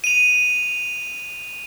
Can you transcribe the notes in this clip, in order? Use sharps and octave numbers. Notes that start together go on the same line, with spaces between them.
D#7 F7